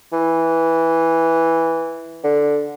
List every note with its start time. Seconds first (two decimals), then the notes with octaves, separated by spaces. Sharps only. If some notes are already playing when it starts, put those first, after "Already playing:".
0.12 E3
2.24 D3